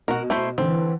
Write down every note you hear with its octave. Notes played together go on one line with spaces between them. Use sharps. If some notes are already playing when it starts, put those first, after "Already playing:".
B2 F#4 A#4
A3 E4 C5
D3 E3 C4